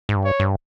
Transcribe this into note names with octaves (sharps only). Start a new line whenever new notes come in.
G#2
G2
C#5
G2